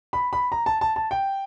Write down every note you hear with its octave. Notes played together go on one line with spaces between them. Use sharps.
B5
B5
A#5
A5
A5
A5
G5